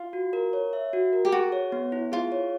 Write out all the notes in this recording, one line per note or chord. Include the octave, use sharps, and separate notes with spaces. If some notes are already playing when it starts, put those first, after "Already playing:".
Already playing: F4
F#4
A#4
C#5
E5
F#4
A#4
G4
F#4 G#4
C#5
B3
E4
F4 G#4
C#5